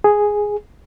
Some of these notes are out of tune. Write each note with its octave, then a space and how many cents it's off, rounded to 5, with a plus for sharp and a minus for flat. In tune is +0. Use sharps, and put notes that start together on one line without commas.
G#4 +0